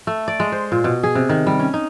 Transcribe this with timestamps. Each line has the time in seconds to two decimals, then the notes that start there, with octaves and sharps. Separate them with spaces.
0.07 A3
0.28 D5
0.40 G#3
0.52 C5
0.72 A#2
0.84 B2
1.03 G#4
1.15 C3
1.29 D#3
1.47 G3
1.59 C#4
1.74 D#4